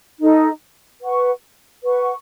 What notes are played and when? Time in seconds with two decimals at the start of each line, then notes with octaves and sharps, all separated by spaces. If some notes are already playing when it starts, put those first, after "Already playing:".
0.20 D#4 A4 D#5
1.02 B4 F#5 C#6
1.84 B4 F#5 C#6